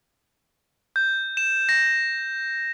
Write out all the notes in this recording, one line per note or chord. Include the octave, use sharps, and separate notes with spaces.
G6
E7
A#6